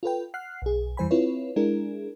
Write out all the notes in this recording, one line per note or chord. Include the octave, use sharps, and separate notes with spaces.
F4 A4 B4 G5
F#5 F6 F#6 C7
B1 G#4
F2 E3 G3 C5 G#5 B5
C4 E4 F4 B4 C#5
G#3 D4 E4 G#4 A#4